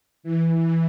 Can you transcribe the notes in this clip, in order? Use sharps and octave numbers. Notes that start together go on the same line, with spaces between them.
E3